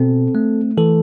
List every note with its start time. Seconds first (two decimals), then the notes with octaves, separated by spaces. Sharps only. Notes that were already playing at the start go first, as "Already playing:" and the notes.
Already playing: B2 C4 A4
0.35 A3
0.78 E3 A4